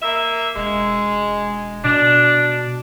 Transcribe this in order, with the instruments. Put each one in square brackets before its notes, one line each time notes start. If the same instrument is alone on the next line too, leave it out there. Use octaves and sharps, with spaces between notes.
[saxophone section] A#3 E5
[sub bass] E1 [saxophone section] G#3
[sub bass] B2 [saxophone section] D4